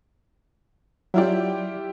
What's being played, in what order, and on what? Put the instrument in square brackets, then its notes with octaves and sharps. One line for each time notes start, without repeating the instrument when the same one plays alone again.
[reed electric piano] F#3 D5 [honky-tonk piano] E4 F4 G4